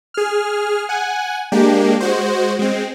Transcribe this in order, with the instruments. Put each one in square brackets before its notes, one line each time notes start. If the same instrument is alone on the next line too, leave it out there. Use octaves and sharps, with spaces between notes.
[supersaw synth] G#4 F6
F#5 G#5
G#3 A#3 D4 G4
G#3 F#4 C5
G#3 C4